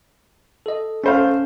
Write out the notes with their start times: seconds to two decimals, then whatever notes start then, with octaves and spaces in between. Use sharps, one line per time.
0.66 A4 D#5
1.04 A3 C#4 C5 F5